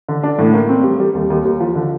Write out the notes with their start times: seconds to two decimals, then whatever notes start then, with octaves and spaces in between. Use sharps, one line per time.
0.09 D3
0.23 D4
0.39 A2
0.54 A#3
0.69 C4
0.84 G3
1.00 G3
1.15 D#2
1.30 D#2
1.45 D#2
1.60 F3
1.76 D3